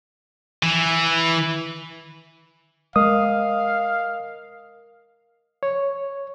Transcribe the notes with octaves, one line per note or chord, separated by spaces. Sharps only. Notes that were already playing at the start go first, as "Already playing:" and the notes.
E3
G#3 A#4 D#5 F5 D#6
C#5